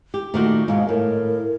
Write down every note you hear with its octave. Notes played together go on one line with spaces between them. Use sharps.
G4
A#2 D#3 A3 F#4
G#2 B2 F5
A2 A#4